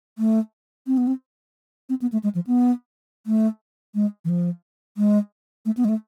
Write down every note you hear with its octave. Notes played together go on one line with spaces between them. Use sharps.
A3
C4
B3
C4
C4
B3
A3
G#3
F3
B3
A3
G#3
E3
F3
G#3
A3
B3
G#3
A3